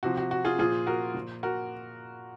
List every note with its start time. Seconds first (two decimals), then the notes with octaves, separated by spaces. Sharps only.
0.03 C3 F3 F#4
0.17 F#4
0.31 F#4
0.45 F4 G#4
0.59 A#2 F3 F4 G#4
0.87 F#4 A#4
1.14 A#2 F3
1.43 F#4 A#4